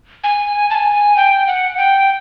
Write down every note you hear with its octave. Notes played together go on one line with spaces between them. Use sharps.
G#5
A5
G#5
G5
F#5
G5